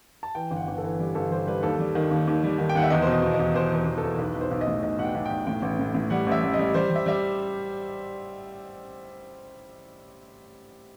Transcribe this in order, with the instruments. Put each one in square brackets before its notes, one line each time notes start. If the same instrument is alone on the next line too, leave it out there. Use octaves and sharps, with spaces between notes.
[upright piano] A5
E3 G5
G1
F#5
G1
A4
E3
G3
G1 A4
G3 C5
G3 B4
D#2 A4
G3
D#3
D#2
D#2
G3
D#3
G5
D#2 F#5
E5
E2 D#5
B2 C5
D#5
B2
D#5
E2
E2 C5
E2 C5
E2
A4
E2
B1 B4
B1
C5
B1
D#5
A2
B1 D#5
B1 F#5
G5
B1
B1 G5
A2 G5
A1
A2
A2
G3 F#5
A1 E5
A1
G3 D#5
G3 C5
G3
E5
G3 E5